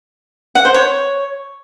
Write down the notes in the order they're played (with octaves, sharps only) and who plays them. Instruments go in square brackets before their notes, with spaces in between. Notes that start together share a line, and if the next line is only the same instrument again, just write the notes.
[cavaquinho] F#5
C5
C#5